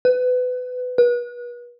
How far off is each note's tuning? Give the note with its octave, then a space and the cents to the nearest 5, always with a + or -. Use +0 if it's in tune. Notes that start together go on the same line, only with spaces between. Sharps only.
B4 +25
B4 -35